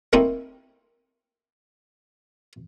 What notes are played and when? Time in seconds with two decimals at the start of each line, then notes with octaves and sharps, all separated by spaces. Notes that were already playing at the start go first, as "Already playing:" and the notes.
0.13 A3 A#3 C4 D#4 E4